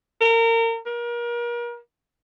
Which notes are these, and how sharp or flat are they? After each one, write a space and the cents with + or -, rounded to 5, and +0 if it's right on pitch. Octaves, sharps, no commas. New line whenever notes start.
A#4 -30
A#4 +35